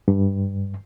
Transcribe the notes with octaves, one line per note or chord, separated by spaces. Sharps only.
G2